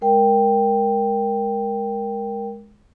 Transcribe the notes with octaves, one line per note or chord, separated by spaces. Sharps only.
G#3 A#4 G5